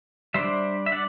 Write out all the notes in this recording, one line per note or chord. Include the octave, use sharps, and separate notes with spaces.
G3 D4 C5 E5
E5
D5 F#5